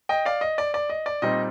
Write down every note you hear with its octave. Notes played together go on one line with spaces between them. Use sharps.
D#5 G5
D5 F5
D#5
D5
D5
D#5
D5
A#2 G3 C4 D#4 D#5